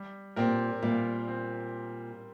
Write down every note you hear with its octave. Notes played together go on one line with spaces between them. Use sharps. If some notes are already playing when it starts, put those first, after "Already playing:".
Already playing: G3
A#2 C4 G4 A#4
A#2 G3
C4